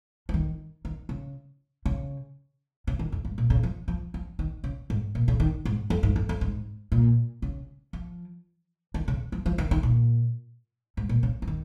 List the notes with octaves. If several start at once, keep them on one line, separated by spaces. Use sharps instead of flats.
F3
D#3
D#3
C#3
C#3
C#3
D#3
F2
G#2
A#2
C#3
F3
F3
F3
D#3
C#3
G#2
A#2
C#3
D#3
G#2
F2
G#2
F2
F2
G#2
A#2
C#3
F3
D#3
C#3
F3
F3
D#3
D#3
A#2
G#2
A#2
C#3
F3
D#3